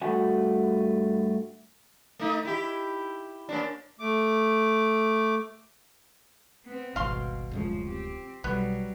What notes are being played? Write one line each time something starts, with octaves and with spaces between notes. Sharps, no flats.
G2 A3 F#4 F#5 G#5
A3 D#4
E4 G4
A#3 C#4 D4
A3 D6
B3 C4
D#1 G#1 B2 F5 C6
D1 F#2 C#3 F3 G#3
C4 G4
B1 F#3 G3 B3